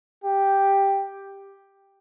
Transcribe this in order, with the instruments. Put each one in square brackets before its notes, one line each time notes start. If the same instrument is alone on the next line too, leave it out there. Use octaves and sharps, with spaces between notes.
[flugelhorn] G4